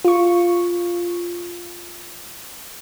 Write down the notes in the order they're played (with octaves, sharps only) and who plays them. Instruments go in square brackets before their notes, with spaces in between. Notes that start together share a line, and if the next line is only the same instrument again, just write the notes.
[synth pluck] F4 C#6